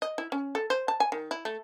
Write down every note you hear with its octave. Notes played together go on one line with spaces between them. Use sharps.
D#5
E4
C#4
A4
C5
A5
G#5
D#3
E4
A3